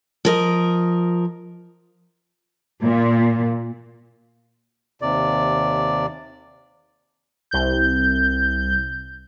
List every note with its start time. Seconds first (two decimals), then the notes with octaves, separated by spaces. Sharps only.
0.25 F3 A#4 D#5
2.83 A#2
5.02 D#2 C3 D5
7.51 C2 G6